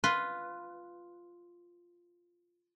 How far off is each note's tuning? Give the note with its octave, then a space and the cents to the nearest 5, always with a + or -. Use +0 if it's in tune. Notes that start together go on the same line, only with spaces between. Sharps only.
F4 +0 B4 +0 C6 +0